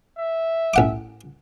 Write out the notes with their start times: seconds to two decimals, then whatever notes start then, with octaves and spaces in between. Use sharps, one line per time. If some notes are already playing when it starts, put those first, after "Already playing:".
0.18 E5
0.74 A1 F#5 D6